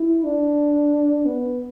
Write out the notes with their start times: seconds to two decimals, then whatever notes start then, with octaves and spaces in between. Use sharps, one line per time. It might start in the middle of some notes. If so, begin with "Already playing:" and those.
Already playing: E4
0.24 D4
1.26 B3